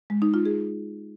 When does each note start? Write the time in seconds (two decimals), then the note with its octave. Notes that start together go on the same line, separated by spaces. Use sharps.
0.10 G#3
0.22 D#4
0.34 F4
0.45 G#4